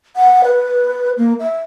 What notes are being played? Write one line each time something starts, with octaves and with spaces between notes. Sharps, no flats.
F#5
B4
A#3
E5